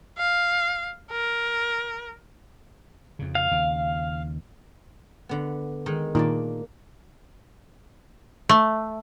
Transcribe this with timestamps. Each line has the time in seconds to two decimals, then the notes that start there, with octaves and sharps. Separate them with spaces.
0.18 F5
1.11 A#4
3.19 F2 C#3
3.35 F5
3.51 D#2 C#3
5.29 D3 B3
5.86 D#3 G#3 D#4
6.15 A#2 D#3 A#3 D4 D5
8.49 A3